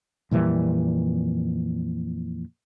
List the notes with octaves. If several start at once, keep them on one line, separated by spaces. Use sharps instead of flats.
F2 A#2 E3 G3